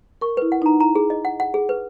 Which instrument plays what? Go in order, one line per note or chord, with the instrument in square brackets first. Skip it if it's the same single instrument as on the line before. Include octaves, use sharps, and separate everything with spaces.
[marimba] A#4 [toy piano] C#6
[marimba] E4 [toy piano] B4
[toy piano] F#5
[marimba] D#4 [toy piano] A#5
[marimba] E4 [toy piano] A#5
[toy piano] G#4
D#5
F#5
F#5
G#4
B4